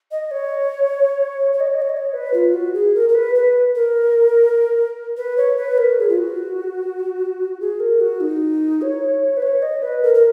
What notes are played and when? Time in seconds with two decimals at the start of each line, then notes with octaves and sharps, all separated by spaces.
0.11 D#5
0.31 C#5
1.53 C#5
1.60 D#5
1.67 C#5
1.74 D#5
1.82 C#5
1.89 D#5
1.97 C#5
2.14 B4
2.34 F4
2.54 F#4
2.74 G#4
2.94 A#4
3.09 A#4
3.15 B4
3.35 B4
3.75 A#4
5.17 B4
5.37 C#5
5.57 B4
5.78 A#4
5.99 G#4
6.09 F4
6.18 F#4
7.60 G#4
7.80 A#4
8.01 F#4
8.21 D#4
8.82 C#5
9.37 B4
9.42 C#5
9.62 D#5
9.82 B4
10.03 A#4
10.14 A#4